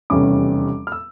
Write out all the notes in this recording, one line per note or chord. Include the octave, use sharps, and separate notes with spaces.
F1 E2 C#3 G3 C#4 D6
F6
E6